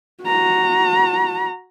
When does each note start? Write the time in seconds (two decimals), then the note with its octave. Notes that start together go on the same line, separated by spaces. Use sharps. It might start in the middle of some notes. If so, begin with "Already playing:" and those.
0.24 F#4 A#5